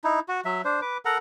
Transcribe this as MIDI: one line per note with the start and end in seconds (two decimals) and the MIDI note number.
0.04 0.20 63
0.04 0.20 64
0.28 0.41 66
0.45 0.62 54
0.45 0.62 76
0.65 0.80 62
0.65 0.80 72
0.82 0.98 71
0.82 0.98 86
1.05 1.18 69
1.05 1.18 70
1.05 1.18 78
1.05 1.18 82